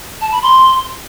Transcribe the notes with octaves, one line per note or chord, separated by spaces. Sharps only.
A5
B5
C6